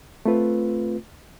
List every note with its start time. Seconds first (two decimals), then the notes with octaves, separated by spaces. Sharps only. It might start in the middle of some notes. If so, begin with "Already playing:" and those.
0.25 A3 C4 F4 B4